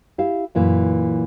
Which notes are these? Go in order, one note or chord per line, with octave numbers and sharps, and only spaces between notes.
E4 G4 F5
F#2 A#2 E3